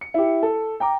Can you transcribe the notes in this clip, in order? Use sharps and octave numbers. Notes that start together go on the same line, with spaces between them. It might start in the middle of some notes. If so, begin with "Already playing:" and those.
C#7
E4 G4
A4
G5 A#5 D6